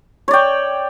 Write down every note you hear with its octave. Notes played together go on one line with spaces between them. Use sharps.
C#5 D5 G5